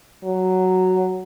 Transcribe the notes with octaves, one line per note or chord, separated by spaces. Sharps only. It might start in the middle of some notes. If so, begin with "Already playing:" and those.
F#3